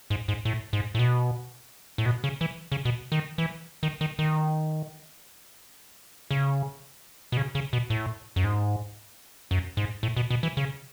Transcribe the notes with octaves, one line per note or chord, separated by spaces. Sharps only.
G#2
G#2
A2
G#2
A2
B2
A2
B2
C#3
E3
C#3
B2
D#3
E3
D#3
D#3
D#3
C#3
B2
C#3
C#3
B2
A2
F#2
G#2
F#2
G#2
A2
B2
B2
E3
C#3